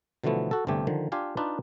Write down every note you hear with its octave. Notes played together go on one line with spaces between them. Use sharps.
B2 D3 E3 F3 A3 B3
F#4 A4
G1 G2 C3 A3 G4 G#5
D3 D#3 F3
D4 F4 G4 F5 G#5
D4 D#4 F4 B4 D5